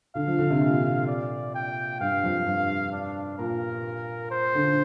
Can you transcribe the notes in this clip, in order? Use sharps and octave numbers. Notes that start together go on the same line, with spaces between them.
D3 F5
F3
D3
C3
A#2
D5
G5
G2 F5
F2
G2
D4
A#2 A#4
C5
D3